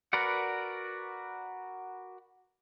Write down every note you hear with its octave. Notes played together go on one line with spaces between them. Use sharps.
F#4 A#4 B4 D5 F#5